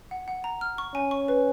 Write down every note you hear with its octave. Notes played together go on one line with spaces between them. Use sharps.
F#5
F#5
A#5
F6
C#6
C#4 G#5
C#6
B4